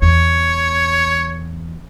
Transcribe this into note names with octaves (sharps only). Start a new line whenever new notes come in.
E2 C#5